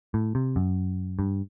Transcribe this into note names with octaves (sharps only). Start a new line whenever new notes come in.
A2
C3
F#2
G2